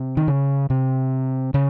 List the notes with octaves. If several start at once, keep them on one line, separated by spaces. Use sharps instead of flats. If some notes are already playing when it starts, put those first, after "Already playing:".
Already playing: C3
D#3
C#3
C3
C#3